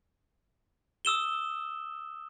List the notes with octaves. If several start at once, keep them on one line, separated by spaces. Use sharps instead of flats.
D#6 E6 E7 G7